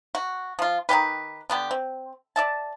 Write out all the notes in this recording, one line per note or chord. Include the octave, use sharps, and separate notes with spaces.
F#4
F3 F4
D#3 G#3 G4 B4
D3 B3 G4
C4
D5 E5 A5